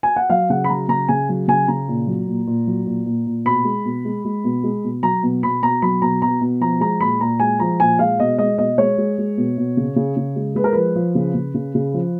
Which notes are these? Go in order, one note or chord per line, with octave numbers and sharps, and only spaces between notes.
G#5
F#5
F#3 F5
C#3 F#5
B5
F#3 A#5
C#3 A#5
C#3 G#5
F#3
C#3 G#5
C#3 A#5
A#2
F#3
A#2
A#2
F#3
A#2
A#2
A#2
B2 B5
G#3
B2
G#3
G#3
B2
G#3
B2
F#3 A#5
B2
B2 B5
B2 A#5
F#3 B5
B2 A#5
B2 A#5
B2
F3 A#5
G#3 A#5
A#2 B5
A#2 A#5
G#3 G#5
F3 A#5
A#2 G#5
G#3 F5
B2 D#5
G#3 D#5
B2 D#5
G#3 C#5
G#3
G#3
B2
B2
C#3
C#3
C#3
G#3
G#3 B4
A#4
F3 B4
F3
C#3
C#3
C#3
C#3
F3